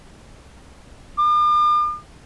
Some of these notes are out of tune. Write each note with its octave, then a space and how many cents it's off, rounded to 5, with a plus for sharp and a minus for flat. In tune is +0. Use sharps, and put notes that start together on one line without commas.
D6 +45